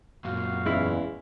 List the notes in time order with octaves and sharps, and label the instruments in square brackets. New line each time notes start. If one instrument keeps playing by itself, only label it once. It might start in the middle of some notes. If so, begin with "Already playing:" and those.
[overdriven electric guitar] F#2 A#2 [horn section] F#4 F5
[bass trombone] E2 [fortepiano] C#3 G#3 E4